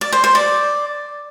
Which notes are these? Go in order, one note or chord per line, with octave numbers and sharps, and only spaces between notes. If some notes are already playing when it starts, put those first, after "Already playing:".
D5
C5
C5
D5